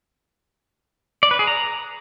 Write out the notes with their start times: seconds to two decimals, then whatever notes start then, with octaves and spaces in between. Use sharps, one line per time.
1.23 D5
1.31 B4
1.39 G#4
1.47 A#5